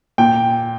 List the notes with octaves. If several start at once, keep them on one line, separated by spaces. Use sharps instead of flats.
A#2 G5